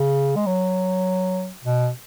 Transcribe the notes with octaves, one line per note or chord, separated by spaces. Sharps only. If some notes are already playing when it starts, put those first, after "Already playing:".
Already playing: C#3
G#3
F#3
B2